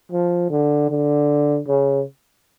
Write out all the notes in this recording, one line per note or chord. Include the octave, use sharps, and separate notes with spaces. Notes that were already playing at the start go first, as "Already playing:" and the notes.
F3
D3
D3
C#3